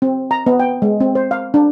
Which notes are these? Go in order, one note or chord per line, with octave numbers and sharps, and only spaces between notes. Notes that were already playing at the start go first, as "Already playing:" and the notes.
C4
A#5
B3
G5
G#3
C4
C5
F5
D4